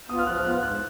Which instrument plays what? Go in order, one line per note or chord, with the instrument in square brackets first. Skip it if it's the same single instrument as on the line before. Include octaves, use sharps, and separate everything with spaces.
[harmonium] B3 [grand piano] D#6
[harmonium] F4
[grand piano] F6
[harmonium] F3 [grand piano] F#6
[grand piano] F6
[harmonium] B3 F4 [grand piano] F#6
[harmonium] G#2 [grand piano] F#6